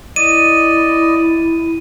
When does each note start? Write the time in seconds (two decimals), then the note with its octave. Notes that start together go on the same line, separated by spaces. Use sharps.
0.16 E4 D5 D#5 D#7